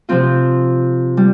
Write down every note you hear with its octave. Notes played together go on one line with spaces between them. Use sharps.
C3 F3 C4 F4
G3